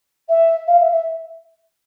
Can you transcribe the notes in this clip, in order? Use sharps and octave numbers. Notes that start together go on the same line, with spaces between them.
E5
F5
E5
E5